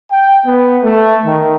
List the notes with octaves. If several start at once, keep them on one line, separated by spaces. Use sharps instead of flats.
G5
B3
A3
D#3